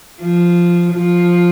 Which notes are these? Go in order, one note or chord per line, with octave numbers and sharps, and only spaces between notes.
F3
F3